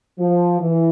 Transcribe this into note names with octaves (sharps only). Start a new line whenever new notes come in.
F3
E3